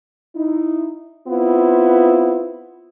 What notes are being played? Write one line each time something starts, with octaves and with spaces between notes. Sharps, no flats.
D#4 E4
B3 C4 E4 F4